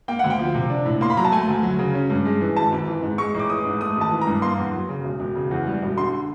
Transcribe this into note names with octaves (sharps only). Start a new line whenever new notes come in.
A#3 G5
D2 F#5
G5
F3
C3
D4
A2
A#3 C6
B5
F#3 A#5
A5
A3 G#5
D2
F#3
C#3
C#4
G2
G#3
E3
G#1 A5
G#1
E3
G#2
G#3 C#6
A1
D6
E3 D#6
G#2
A3 D#6
G#1 A5
E3
A#5
G2
A#3 C6
E2
F#3
C#3
E1
E1
C#3
E2
G3
E1
D3 C6